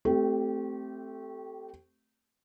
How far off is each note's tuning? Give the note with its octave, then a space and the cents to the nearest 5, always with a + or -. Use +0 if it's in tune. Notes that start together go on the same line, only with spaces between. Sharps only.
A3 +0 C4 +0 G4 -25